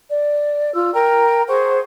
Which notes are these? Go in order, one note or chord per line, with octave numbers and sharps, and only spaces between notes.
D5
F4 E6
A#4 G5 A#5
G#4 C5 F#5 C#6